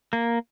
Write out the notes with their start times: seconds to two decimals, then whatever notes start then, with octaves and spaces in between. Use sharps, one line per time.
0.13 A#3